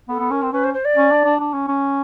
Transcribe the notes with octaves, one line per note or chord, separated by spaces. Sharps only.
B3 A4
B3
C#4 A#4
C4
C#4 B4
C5
C5
D5
C#4
D4
D4
D4
C#4
C#4